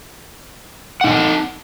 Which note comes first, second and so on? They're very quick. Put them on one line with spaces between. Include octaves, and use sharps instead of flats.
F#5 D#4 G#5 A5